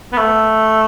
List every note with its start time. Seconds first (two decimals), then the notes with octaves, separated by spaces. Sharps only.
0.13 B3
0.18 A3